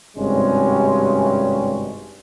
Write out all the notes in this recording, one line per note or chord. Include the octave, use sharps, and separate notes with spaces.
G#1 G2 C3 G3 G#3 C#4